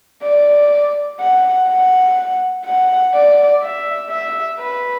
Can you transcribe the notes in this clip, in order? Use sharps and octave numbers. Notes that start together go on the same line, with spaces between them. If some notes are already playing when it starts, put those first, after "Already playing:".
D5
F#5
F#5
F#5
D5
E5
E5
B4